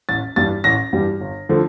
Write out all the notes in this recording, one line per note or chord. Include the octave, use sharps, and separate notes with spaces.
A1 A6
G2 E3 G3 A6
A1 A#6
G2 E3 G3
G1
D3 F3 A3